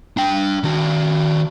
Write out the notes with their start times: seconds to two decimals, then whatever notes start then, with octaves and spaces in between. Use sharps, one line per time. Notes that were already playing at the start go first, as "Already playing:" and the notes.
0.17 D4 G5
0.63 D#3 F#4